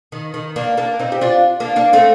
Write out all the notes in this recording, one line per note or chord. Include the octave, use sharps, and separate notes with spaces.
D#3
D#3
A#3 D4
A#3 D4
C4 D#4
G4
D4 F4
A#3 D4
A#3 D4
A3 C4